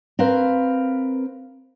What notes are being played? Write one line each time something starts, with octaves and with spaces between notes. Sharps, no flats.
C4 A#4 B4 F5